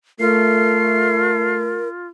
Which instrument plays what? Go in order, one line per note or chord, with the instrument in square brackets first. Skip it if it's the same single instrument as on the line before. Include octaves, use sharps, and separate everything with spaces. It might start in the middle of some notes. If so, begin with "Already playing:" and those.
[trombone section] A3 [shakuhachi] F4 [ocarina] A#4 [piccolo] C7